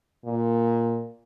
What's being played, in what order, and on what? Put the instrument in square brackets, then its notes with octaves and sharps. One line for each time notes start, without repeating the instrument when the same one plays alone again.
[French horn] A#2